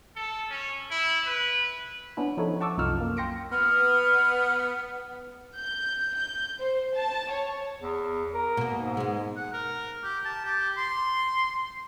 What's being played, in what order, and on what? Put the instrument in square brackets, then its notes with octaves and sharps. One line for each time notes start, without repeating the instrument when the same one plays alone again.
[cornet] A4
C#4
E4
B4
[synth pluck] B3 C#4 D4 E4
F3 D#4 E4 A4 C#5
F#5 A5 C#6 D6 E6
C2 F#2 D#4 F4 E6 F6
A#3
G5 C6 A#6 C#7 D7
[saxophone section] B3 [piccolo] F6
[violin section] G6
G6
C5
A5
C#5
[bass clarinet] E2
A#4
[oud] B2 A#3
[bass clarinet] G#2
[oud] G#3 B3
[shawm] F#5
A#4
G4
A5
G4
C6